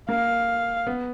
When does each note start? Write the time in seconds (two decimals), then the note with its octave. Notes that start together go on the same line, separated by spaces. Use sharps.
0.09 A#3 F5
0.87 B3